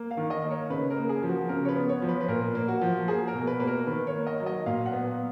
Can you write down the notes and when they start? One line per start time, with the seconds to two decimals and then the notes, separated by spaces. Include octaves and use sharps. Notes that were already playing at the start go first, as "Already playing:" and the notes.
Already playing: A#3
0.11 F5
0.17 D#3
0.30 D#5
0.43 A#3
0.50 C#5
0.70 C#3 B4
0.90 A#4
0.96 A#3
1.09 G#4
1.23 F3
1.29 F#4
1.49 C#3 A#4
1.65 C#5
1.69 B4
1.75 B3
1.89 C#5
2.02 F3
2.08 B4
2.21 B4
2.28 A#2 A#4
2.55 A#3
2.68 F#4
2.81 F3
3.08 A#3 G#4
3.28 A#4
3.34 B2
3.47 B4
3.60 A#3 B4
3.67 A#4
3.87 D#3 B4
4.07 C#5
4.13 A#3
4.27 D#5
4.40 F#3
4.46 D#5
4.66 A#2 F5
4.86 F#5
4.92 B3